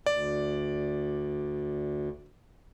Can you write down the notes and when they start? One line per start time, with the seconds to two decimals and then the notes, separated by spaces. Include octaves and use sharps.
0.06 D2 D5